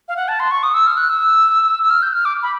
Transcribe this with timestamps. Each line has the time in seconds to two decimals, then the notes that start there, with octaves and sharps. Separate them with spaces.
0.08 F5
0.16 F#5
0.28 A5
0.40 C6
0.51 C#6
0.63 D#6
0.74 E6
0.87 F6
0.97 F#6
1.10 E6
1.83 E6
1.90 F6
2.02 G6
2.13 F6
2.25 D6
2.43 B5